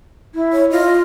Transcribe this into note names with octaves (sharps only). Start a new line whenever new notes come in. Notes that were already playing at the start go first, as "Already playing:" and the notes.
E4
C#5
F4 D#5
D#5